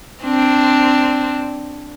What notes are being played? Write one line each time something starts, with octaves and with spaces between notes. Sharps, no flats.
C4 D4